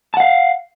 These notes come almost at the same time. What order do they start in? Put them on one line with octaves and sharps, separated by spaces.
A5 F#5 F5